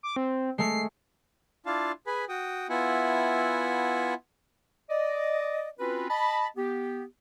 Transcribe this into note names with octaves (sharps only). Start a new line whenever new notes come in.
D6
C4
G#3 A3 C7
D4 E4 F4 F5 A5
G#4 B4 G#5 B5
F#4 G5 D#6
B3 E4 F4 E5 F#5 G#5
D5 D#5
C4 C#4 F4 F#4 B4
D#5 A5 B5
B3 G4